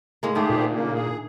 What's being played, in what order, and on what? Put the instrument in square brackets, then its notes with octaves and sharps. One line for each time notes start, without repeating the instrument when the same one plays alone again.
[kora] A2 G#3 A#3
[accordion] G#2 G4 G#4 [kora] D#3 A3 D4
[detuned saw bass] A#2
[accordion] C#3 A#3
G#4